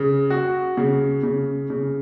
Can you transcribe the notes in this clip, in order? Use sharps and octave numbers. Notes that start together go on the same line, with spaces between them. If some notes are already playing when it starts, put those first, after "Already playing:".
Already playing: C#3
F#4
C#3
C#3
C#3